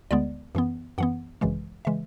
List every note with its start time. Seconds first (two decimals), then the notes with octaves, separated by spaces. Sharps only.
0.11 D2 D3 G#3 B3 D5
0.55 F#2 E3 B3
0.98 F#2 E3 B3 F#5
1.41 G#1 F#2 C#3 E3 G#3
1.85 C#3 E3 G#3 E5